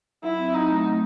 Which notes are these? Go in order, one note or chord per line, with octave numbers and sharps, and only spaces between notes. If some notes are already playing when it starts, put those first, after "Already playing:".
F#3 E4
C4
F#3 D#4
A3
F#3